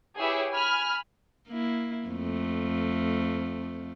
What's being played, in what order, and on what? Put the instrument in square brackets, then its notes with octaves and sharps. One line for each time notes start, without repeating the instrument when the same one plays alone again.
[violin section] E4 G4 G#4 B4 C#5 E5
G#5 B5 F6
[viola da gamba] A#3 E4
F2 A3